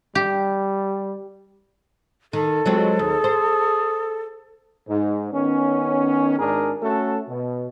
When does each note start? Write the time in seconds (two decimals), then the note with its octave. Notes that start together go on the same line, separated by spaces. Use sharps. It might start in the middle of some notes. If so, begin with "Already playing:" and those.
0.15 G3 G4
2.33 D#3 A4
2.66 F#3 G#3 C4 F4
2.99 D#2 G#4
3.24 C5
4.88 G#2
5.33 D#3 B3 C#4
6.39 G#1 G#2 D4 G#4 A#4
6.82 A3 C#4 F#4 A4
7.28 B2